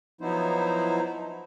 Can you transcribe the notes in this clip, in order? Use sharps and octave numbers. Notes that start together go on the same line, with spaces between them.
F3 F#3 B3 D#4 E4 C5